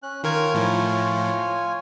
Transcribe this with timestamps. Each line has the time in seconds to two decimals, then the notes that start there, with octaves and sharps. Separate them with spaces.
0.03 C#4 F#6
0.24 D#3 F4 A#4 C#5 G#5 G#6
0.54 A2 F3